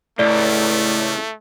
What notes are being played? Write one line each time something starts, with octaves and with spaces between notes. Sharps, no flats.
C#2 A2 A3 D5